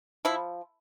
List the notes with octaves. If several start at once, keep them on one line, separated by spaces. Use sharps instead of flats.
F3 E4